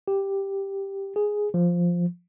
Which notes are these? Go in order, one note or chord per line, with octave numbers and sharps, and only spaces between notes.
G4
G#4
F3